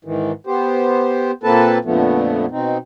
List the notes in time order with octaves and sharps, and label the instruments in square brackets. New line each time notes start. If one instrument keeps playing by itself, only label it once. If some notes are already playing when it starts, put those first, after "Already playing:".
[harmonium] G#2 D#3 E3
B3 G4 C5
A#2 A#3 C4 A4 B4 A5
F2 A#2 D3 F3 A3 B3
B2 C4 D#4